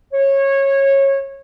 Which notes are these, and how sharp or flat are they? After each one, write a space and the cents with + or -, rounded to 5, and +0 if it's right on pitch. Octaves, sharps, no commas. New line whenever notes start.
C#5 -20